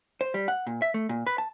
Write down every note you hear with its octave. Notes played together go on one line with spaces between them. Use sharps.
C5
G3
F#5
A#2
E5
A3
A#2
B4
A5